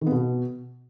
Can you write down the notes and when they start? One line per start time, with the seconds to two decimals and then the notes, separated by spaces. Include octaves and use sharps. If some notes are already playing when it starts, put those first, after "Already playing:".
0.01 D#3
0.07 B3
0.12 B2